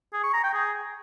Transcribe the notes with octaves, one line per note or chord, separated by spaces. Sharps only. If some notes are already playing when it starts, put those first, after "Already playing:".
G#4
C#6
A#5
G5
G#4